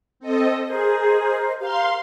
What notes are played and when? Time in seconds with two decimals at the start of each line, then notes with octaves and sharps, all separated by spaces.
0.20 C4 A4 D#5
0.66 G#4 A#4 C5 D#5
1.60 G4 A#4 C5 F5 C6